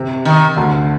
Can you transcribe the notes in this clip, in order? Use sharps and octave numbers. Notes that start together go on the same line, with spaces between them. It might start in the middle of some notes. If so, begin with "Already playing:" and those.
Already playing: C3
D#3
D2 D3